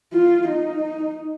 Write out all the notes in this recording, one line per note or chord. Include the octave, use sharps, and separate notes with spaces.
F4
D#4